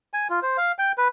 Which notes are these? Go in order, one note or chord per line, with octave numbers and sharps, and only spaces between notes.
G#5
F4
C5
F5
G5
B4